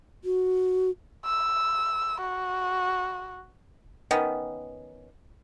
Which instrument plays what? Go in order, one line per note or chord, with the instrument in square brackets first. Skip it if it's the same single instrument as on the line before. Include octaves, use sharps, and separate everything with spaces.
[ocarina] F#4
[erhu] E6
F#4
[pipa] D#3 B3 C#4